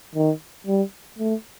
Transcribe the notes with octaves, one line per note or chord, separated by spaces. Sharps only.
D#3
G3
A3